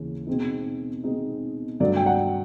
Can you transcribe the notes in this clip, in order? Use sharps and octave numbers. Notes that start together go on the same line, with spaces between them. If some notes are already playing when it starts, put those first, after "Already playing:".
Already playing: D#2 C#3 E3 C#4
B2 G#3 C4 D#4
B2 G#3 C4 D#4
G2 D3 F#3 A3 D4 D5
G5
F#5